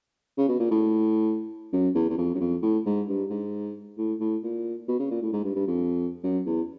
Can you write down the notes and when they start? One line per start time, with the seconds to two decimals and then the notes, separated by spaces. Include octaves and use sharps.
0.38 C#3
0.49 B2
0.59 A#2
0.71 A2
1.73 F#2
1.95 E2
2.10 E2
2.18 F2
2.34 F#2
2.40 F2
2.62 A2
2.86 G#2
3.08 G2
3.30 G#2
3.98 A2
4.20 A2
4.43 A#2
4.88 B2
4.99 C#3
5.11 A#2
5.22 A2
5.33 G#2
5.45 G2
5.56 G2
5.67 F2
6.23 F#2
6.46 E2